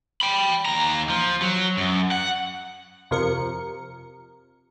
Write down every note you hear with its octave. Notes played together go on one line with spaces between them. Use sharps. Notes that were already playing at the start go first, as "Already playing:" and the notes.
G5 B5
D#2 A#5
F3
F#3
F#2
F#5
F2 C3 F3 A#4 C#7